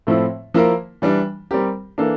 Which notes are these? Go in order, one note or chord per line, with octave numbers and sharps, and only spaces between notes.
A2 F3 A3 C4 E4
F3 A#3 E4 A#4
E3 G3 D4
G3 C4 G4 A#4
E3 A#3 D4 A4